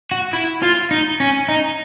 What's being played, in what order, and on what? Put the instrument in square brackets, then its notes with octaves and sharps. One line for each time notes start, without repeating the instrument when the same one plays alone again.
[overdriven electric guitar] F#4
E4
F4
D#4
C#4
D#4